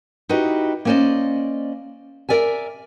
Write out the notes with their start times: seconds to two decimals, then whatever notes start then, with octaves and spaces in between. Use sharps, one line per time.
0.29 D#4 E4 F#4 G4 B4 D#5
0.85 A#3 B3 C#4 C5 D5 D#5
2.29 A#4 D5 E5 G#5